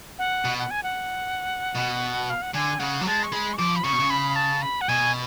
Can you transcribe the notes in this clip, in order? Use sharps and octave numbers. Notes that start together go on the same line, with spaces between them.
F#5
B2
F#5
G#5
F#5
B2
F5
F#5
D3 G#5
C#3 F#5
F#3
G#3 A5
C#6
G#3 B5
C#6
F3 D6
B5
C#3 C#6
B2
C#3
B5
A5
B5
F#5
B2 G#5